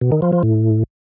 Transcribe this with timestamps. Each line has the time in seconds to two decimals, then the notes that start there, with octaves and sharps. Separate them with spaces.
0.01 B2
0.12 D#3
0.22 F3
0.32 F3
0.43 A2